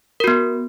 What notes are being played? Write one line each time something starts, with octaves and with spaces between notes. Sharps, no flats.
B3 F#4 A#4